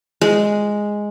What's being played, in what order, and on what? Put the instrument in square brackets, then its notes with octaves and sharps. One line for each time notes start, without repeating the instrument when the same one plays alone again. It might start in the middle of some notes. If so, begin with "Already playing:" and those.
[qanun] G#3